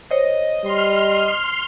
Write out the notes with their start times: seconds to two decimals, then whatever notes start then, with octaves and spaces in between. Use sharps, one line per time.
0.11 C5 C#5 D#5
0.64 G3 C6 F6